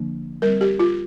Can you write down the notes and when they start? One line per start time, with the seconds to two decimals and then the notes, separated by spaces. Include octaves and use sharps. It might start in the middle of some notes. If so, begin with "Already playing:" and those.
Already playing: D3 F3 A#3 D4
0.42 G3 C4 A#4
0.61 G4
0.79 F4